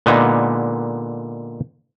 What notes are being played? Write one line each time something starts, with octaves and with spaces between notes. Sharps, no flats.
A#2 D3 G#3 B3 D#4